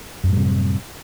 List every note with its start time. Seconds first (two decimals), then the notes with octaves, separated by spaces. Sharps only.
0.24 F#2
0.28 A2
0.33 G3
0.37 C3